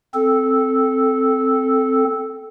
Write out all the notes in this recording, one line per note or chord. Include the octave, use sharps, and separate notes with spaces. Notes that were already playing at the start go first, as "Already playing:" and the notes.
C4 A4